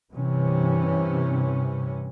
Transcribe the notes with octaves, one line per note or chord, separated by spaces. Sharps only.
G2 C3 E3 C#4